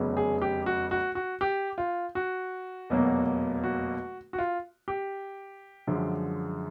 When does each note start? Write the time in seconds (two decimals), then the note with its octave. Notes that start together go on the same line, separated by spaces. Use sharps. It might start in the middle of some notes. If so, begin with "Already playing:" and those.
Already playing: F1 E2 C#3 F#3
0.17 G#4
0.42 G4
0.66 F#4
0.91 F#4
1.15 F#4
1.41 G4
1.78 F4
2.15 F#4
2.90 F1 E2 B2 F#3 A#3
3.64 F#4
4.33 F#4
4.38 F4
4.88 G4
5.87 F#2 D3 F3 G#3